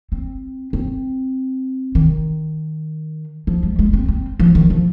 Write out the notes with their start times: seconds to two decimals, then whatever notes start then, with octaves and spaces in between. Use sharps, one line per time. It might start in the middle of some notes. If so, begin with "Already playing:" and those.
0.12 C4
0.73 C4
1.95 D#3
3.47 F3
3.63 G#3
3.79 G#3
3.93 C4
4.08 C4
4.39 F3
4.55 D#3
4.70 F3